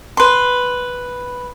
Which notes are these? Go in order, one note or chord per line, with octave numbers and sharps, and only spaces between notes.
B4 C6